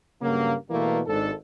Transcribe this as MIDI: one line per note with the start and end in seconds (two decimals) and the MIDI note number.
0.22 0.54 43
0.22 0.54 49
0.22 0.54 54
0.22 0.54 58
0.70 1.01 47
0.70 1.01 52
0.70 1.01 55
0.70 1.01 57
0.70 1.01 58
1.07 1.30 32
1.07 1.30 44
1.07 1.30 62
1.07 1.30 69